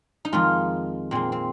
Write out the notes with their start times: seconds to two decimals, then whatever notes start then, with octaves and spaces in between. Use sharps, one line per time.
0.25 D#4
0.32 F2 D#3 G#3 F4
1.11 A#2 G#3 C4
1.32 C4